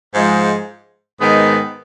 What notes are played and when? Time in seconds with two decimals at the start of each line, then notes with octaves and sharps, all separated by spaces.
0.14 G#2 F3 G#3
1.20 G#2 D#3 G#3 B3